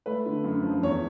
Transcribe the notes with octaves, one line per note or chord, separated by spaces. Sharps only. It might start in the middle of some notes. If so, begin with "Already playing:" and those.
A3 B4
D3
F#2
F3
E2 C#5